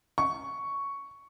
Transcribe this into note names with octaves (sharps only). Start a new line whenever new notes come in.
C#6